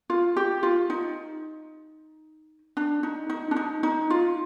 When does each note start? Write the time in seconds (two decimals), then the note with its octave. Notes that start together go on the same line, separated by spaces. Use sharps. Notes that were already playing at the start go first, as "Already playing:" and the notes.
0.10 F4
0.37 G4
0.63 F4
0.90 D#4
2.77 D4
3.03 D#4
3.30 D#4
3.51 D4
3.56 D#4
3.83 D#4
4.10 F4